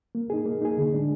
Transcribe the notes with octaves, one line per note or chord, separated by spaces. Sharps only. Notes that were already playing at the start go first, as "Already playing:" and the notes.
A#3
D#4 G#4
A#3
D#4 G#4
D3
G#3 D4